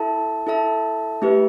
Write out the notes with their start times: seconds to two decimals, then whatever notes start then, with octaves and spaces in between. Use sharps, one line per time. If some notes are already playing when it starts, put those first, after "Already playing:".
Already playing: E4 A4 E5 A5
0.47 E4 A4 E5 A5
1.22 A3 E4 G4 B4 E5